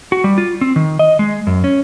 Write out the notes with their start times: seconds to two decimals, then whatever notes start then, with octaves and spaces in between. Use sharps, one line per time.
0.12 F#4
0.24 G3
0.38 F4
0.61 C4
0.76 D#3
0.99 D#5
1.19 G#3
1.47 F#2
1.64 C#4